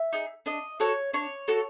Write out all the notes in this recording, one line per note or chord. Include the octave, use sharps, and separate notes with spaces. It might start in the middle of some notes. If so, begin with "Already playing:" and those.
Already playing: E5
D#4 G#4
D4 D#5
F#4 A4 C#5
D4 C#5
F#4 A4